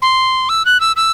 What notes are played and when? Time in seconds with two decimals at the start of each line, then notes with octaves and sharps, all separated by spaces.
0.02 C6
0.49 E6
0.65 F#6
0.80 E6
0.96 E6